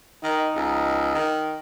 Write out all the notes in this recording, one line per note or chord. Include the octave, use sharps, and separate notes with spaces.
D#3 D#4
C#2
D#3